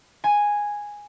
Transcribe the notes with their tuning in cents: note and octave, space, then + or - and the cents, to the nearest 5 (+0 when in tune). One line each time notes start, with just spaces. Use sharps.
G#5 -5